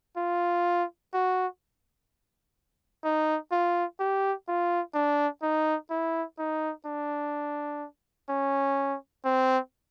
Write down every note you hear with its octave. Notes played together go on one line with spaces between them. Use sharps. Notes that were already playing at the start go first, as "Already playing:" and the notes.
F4
F#4
D#4
F4
G4
F4
D4
D#4
E4
D#4
D4
C#4
C4